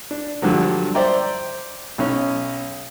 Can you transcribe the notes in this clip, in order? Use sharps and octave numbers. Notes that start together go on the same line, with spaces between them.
D4
G2 D3 F3 F#3
C5 D5 E5 G5 A#5
B1 C#4 C#5